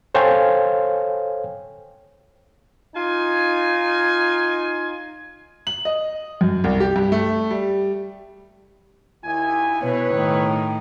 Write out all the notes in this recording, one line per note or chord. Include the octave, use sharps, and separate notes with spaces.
A4 C5 C#5 F5 G5 G#5
D#4 F4 G#5
F#7
D#5
F#2
C2
G4
G2
A3
G3
D#2 E4 G#5
B2 E4 B4 C#5
A2 D#3